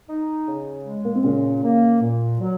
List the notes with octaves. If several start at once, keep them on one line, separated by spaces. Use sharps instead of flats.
D#4
C#3
G#3
A#3
C4
A#2 C#3 C#4
A#3
A#2
F#3